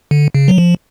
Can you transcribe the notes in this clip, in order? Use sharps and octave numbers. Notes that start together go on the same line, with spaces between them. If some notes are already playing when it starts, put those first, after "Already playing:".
D3
C#3
F#3
F3